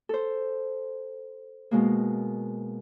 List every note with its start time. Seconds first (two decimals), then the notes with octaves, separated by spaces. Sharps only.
0.09 A4 C5
1.71 B2 G#3 A#3